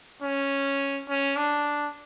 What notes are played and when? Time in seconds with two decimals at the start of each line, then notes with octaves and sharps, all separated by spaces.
0.23 C#4
1.09 C#4
1.37 D4